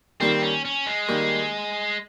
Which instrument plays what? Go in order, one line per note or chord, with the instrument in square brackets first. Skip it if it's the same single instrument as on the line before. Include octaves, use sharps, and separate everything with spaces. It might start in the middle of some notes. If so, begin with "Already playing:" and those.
[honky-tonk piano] D#3 G3 A#3 [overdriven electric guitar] C4
[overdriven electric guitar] C#4
C#4
G#3
[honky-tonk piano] D#3 G3 A#3